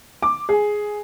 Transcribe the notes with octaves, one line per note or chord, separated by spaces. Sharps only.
D6
G#4